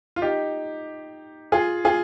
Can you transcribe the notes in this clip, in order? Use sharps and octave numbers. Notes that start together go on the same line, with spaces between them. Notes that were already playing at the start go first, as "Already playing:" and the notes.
F4
D#4 G4
F4 G#4
F4 G#4